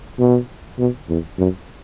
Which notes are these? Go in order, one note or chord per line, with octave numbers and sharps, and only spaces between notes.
B2
B2
E2
F#2